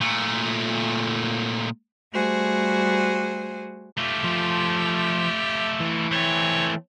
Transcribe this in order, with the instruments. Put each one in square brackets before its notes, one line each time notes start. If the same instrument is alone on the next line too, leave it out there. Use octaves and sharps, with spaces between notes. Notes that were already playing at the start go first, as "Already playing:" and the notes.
[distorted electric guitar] A#2 A3
[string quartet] G3 A3 F#4 G#4 C5
[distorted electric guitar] A3 F4 [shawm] G4
[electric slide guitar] F3
E3
[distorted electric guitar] A3 C4 [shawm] C#5